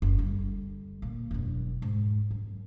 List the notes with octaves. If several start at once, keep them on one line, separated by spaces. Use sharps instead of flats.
F#1
D3 G3
A#2
E1 F#2
G#2
F#2